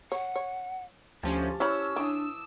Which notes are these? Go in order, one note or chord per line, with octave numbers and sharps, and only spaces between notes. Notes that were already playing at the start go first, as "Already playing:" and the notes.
C#5 F#5
C#5
D2 F3 C#4 G4 A5
C#4 E4 C5 B5 E6
E3 D4 D6 D#6